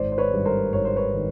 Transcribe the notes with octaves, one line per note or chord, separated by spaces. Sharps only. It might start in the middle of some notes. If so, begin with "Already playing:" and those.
Already playing: G#1 C5 D5
C5
B4 C#5
G2 D#3
A#4 C5
G#1 C#5
C5
B4 C#5
D#3